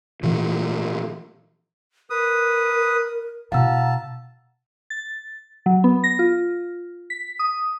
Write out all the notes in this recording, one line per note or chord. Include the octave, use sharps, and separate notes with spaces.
A#2 E3 F3
A#4 B4 D#6
B2 E4 F5 F#5 A5 A#5 E6
A6
F#3
B3
A#6
F4
B6
D#6